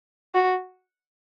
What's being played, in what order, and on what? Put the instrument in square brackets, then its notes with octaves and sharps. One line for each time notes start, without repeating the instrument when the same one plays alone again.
[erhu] F#4